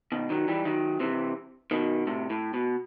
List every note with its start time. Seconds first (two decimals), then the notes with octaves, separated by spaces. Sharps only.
0.12 B2 D#3
0.30 D#3 F#3
0.48 E3 G3
0.65 D#3 F#3
1.00 C3 E3
1.71 B2 D#3
2.07 A2 C3
2.30 A2
2.54 B2